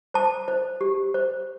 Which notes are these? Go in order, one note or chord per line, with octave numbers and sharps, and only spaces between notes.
C5 A5
C5
G4
C5